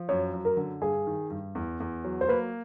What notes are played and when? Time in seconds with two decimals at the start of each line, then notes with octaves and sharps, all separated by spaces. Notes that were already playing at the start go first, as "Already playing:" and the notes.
Already playing: F3
0.09 F#2 C#5
0.33 F#2
0.45 A#4
0.57 D3
0.81 G2 G#4
1.07 D#3
1.30 G2
1.55 E2
1.80 E2
2.04 F#3
2.21 C5
2.29 A#3 B4